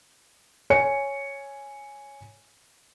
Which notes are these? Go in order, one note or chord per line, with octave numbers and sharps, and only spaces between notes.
C#5 G#5 C#7